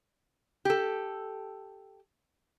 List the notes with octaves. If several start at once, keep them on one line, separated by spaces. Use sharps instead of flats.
G4 A4